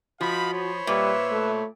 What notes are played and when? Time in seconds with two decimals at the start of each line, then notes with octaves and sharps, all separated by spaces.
0.21 F3 F#4 D#5 F5 B5
0.53 C5 C#5 B5
0.87 A#2 G3 B4 E5
1.31 A3